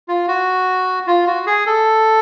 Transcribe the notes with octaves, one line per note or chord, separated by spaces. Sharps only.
F4
F#4
F4
F#4
G#4
A4